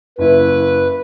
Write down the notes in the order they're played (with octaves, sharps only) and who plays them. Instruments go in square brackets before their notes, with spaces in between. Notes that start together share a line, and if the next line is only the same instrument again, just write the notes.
[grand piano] F#1 E4 [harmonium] B4